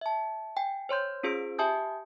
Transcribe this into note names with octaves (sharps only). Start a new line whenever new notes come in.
E5 A5
G5 G#5
C5 C#5 C6 G6
C#4 F4 G#4 C5 E6 D7
G4 E5 G#5 A5 D#6 G6